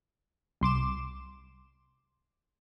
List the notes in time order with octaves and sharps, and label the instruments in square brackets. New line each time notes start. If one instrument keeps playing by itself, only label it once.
[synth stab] C2 C6 D6 E7